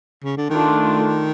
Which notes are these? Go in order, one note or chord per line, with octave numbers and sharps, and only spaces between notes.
C#3
D3
D#3 A3 D4 F4